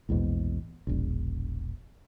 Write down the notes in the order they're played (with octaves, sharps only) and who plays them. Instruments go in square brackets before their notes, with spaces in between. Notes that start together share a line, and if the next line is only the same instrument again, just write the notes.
[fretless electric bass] A#1 E2 G#2 B2
E1 A#1